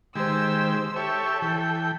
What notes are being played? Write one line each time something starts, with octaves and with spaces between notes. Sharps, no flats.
D#3 G#3 G4 C5 E6
G4 A4 C#5 E5
E3 G5